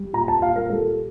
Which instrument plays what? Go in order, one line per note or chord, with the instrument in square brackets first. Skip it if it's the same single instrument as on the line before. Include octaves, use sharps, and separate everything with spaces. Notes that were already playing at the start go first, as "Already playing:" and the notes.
Already playing: [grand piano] G3
A#2 A#5
A5
A#2 F5
A#4
G3 A4